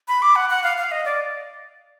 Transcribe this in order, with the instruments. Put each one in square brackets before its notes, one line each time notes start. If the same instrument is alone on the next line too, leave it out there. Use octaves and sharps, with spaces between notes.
[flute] B5
D6
F#5
F#5
F5
F5
D#5
D5